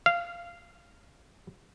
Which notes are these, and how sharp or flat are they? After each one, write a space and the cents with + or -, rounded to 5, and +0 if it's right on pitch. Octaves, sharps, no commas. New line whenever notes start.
F5 -15